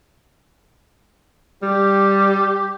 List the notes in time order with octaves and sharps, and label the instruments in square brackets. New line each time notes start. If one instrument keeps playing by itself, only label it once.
[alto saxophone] G3 [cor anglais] G4